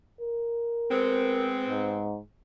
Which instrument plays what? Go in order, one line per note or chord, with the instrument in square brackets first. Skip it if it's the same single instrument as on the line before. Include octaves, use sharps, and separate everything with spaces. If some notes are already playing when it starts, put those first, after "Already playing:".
[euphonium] A#4
[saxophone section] G#3 B3 C4
[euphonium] G#2